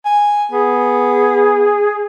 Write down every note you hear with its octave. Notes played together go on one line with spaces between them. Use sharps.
G#5
B3 G#4